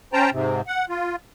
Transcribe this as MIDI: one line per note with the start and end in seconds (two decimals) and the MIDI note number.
0.13 0.30 61
0.13 0.30 72
0.13 0.30 79
0.13 0.30 81
0.13 0.30 82
0.32 0.61 44
0.32 0.61 48
0.67 0.85 78
0.89 1.16 65